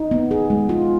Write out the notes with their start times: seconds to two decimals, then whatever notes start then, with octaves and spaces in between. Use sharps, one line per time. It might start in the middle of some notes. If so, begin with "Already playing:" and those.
Already playing: D#4
0.11 B3
0.31 G#4
0.50 G#3
0.69 F4